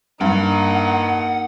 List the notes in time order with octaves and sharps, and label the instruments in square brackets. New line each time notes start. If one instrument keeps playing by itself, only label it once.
[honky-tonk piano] G2 [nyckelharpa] A#3 D#4 [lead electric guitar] F#5